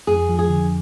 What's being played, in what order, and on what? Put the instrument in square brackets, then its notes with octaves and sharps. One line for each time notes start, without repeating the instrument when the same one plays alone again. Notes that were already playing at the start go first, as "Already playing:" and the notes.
[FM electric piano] F2 [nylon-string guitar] G#4
[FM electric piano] F3
[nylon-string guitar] G#4
[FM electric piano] D3